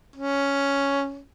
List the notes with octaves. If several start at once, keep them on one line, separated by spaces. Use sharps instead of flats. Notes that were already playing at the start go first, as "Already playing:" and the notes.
C#4